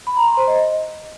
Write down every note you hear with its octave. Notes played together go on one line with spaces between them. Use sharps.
B5
A#5
C6
C5
D#5